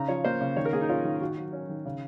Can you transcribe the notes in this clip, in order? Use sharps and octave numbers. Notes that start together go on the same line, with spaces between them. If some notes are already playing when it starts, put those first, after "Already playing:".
Already playing: C#3 D#4 A#5
F3 C#5
A#3 C5
C#3
D#3 C#5
A#4
A#3 G#4
D#4
C#4 F4
D#3
D#3 F#4
F#3
C#4
D#3
C#3